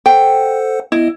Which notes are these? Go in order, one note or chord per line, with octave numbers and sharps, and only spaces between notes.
A4 C5 F#5 G5
B3 E4 D#5